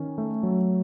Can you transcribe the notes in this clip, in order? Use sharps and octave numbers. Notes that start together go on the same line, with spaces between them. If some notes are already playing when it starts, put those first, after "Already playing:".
Already playing: D#3 C#4
A3
F#3